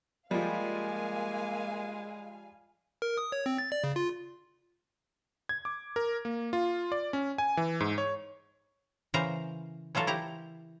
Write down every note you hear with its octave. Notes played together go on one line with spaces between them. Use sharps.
F3 G3 G#3 A#3 F5 G#5
A#4
D#6
C#5
C4
A6
D5
C#3
F4
G#6
D6
A#4
A#3
F4
D5
C#4
G#5
E3
G#2
C#5
C#3 E3 A#4 C5 F5 A#5
E3 F#3 F4 A4 A#4
E4 G4 A#5